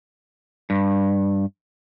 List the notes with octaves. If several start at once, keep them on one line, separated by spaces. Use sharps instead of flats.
G2